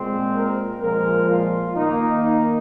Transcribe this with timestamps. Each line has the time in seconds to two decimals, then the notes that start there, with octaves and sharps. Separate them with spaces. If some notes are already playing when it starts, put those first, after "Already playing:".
Already playing: A#2 G#3 C4 C5
0.34 A#4
0.80 A#2 F3 G#3 A#4
1.29 F4
1.76 D#3 A#3 D#4
2.23 D#4